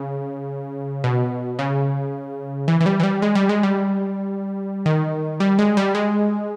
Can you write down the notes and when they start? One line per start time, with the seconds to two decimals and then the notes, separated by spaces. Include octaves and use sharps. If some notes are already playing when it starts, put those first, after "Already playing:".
Already playing: C#3
1.04 B2
1.59 C#3
2.68 E3
2.81 E3
2.86 G3
3.00 E3
3.03 G3
3.22 G#3
3.35 G3
3.49 G#3
3.63 G3
4.86 D#3
5.40 G3
5.59 G#3
5.77 G3
5.95 G#3